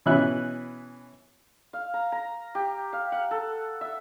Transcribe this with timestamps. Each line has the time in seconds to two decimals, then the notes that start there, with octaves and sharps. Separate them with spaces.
0.06 B2 E3 C#4 E5 F#6
1.73 F5
1.94 A#5
2.12 A#5
2.55 G4
2.93 F5
3.12 F#5
3.31 A4
3.81 E5